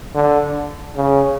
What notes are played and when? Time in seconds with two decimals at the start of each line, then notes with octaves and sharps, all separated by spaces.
0.15 D3
0.96 C#3